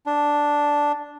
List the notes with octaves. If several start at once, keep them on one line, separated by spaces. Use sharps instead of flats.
D4